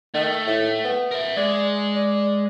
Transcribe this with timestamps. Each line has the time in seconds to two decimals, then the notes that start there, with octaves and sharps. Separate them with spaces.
0.14 D#3 A3
0.47 A2
0.84 B3
1.11 A#4 E5
1.37 G#3 G#4 D5
1.95 D5